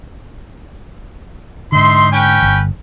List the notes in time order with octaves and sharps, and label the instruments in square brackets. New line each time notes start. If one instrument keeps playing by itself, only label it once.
[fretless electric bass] G#2 D3 [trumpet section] D#4 E5 C6
[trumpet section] C#4 B4 G5
[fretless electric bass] G1